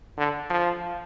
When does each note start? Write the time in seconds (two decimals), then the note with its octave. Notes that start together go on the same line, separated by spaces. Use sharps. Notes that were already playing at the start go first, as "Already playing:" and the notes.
0.18 D3
0.50 F3